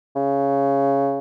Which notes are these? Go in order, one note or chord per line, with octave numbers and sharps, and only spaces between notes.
C#3